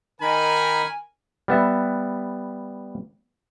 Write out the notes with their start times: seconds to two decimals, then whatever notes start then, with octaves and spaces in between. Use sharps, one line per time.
0.21 D#3 D#4 A#4 G#5 B5
1.48 G3 B3 E5